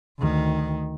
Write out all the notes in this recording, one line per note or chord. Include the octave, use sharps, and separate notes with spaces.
D2 D#3